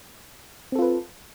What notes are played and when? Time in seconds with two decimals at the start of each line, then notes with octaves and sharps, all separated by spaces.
0.72 C4
0.75 A4
0.79 F4
0.82 B4